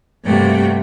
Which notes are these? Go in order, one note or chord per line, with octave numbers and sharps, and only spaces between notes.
G2 C3 A3 A#3 F#4 G5